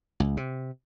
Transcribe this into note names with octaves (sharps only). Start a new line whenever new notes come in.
C#2
C3